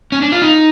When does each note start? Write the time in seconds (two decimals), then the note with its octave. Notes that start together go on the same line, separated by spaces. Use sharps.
0.12 C#4
0.22 D4
0.32 F4
0.42 D#4